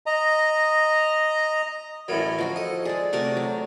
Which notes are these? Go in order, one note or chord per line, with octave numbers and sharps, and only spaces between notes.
D#5 A#5
A1 A2 F#3 A#4
F3 F#4 A#4 D#5
A4 D#5
G#3 G#4 D5
C3 A3 F#4 A#4
F#3